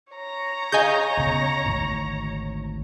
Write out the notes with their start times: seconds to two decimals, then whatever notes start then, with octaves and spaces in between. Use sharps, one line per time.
0.13 C#5 A#5
0.72 G#4 D#5 F5 G#5 G6
1.17 D2 C#3 B3
1.66 G#1 D2 G#2